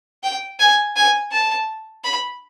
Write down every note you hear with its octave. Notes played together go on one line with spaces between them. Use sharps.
G5
G#5
G#5
A5
B5